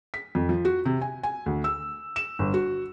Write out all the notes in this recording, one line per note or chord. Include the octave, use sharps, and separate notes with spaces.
B6
F2
F3
F#4
C3
G#5
G#5
D2
E6
E7
G1
F#4